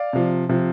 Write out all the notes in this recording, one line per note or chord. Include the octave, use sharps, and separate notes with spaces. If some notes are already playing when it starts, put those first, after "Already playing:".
Already playing: D5 F5
C3 F3
C3 F3